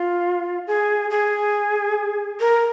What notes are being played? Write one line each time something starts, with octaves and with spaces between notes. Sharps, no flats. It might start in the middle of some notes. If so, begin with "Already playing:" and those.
Already playing: F4
G#4
G#4
A#4